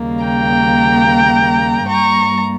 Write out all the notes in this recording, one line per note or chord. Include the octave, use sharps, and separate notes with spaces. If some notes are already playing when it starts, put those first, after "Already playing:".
Already playing: D#2 C#3 G3 A#3
G5 A#5
G2 G3 A#3 A#5 C#6